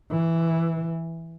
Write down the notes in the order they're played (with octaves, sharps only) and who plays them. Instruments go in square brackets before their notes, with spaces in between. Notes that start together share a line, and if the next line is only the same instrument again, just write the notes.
[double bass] E3